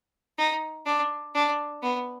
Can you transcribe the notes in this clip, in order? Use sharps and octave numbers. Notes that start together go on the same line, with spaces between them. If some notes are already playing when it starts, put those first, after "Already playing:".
D#4
D4
D4
B3